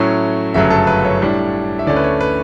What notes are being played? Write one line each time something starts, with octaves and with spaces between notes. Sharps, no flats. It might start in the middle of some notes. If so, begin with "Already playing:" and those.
Already playing: A2 F#3 A3 C#4 E4
G1 F#2 C#3 F#3 A3 E5
A4
B4
C#5
A2 G3 D4
E5
D2 D3 A3 C#4 E4 D5
B4
C#5
B4